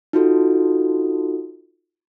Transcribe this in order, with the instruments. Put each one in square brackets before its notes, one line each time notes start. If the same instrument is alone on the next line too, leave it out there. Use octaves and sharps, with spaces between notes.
[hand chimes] D#4 F4 F#4 A4